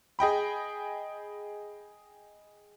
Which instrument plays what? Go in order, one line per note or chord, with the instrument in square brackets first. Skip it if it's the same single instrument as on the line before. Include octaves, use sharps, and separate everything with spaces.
[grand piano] G#4 D#5 G5 B5